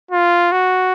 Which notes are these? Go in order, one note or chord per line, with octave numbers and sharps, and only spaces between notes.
F4
F#4